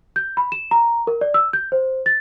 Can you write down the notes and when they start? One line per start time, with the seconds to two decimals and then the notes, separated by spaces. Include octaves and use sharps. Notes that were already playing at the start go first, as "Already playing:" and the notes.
0.16 G6
0.37 B5
0.52 E7
0.71 A#5
1.07 A#4
1.21 D5
1.34 E6
1.53 G6
1.72 C5
2.06 A6